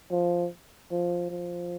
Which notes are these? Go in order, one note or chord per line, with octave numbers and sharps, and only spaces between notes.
F3
F3
F3